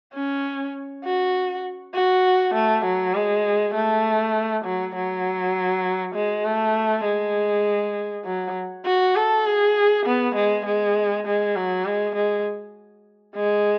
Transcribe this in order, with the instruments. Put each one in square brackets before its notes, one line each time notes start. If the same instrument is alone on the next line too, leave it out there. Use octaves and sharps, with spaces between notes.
[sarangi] C#4
F#4
F#4
A3
F#3
G#3
A3
F#3
F#3
G#3
A3
G#3
F#3
F#4
A4
G#4
B3
G#3
G#3
G#3
F#3
G#3
G#3
G#3